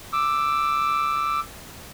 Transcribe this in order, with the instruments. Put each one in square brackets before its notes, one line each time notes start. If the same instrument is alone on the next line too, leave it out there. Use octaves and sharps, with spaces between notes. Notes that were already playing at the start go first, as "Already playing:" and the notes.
[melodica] D6 E6